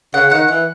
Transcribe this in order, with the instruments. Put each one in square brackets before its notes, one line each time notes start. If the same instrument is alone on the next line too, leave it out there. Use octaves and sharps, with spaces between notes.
[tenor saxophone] C#3 [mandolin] F#5
[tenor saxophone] D#3 [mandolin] F#5
[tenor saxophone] E3 [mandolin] F#5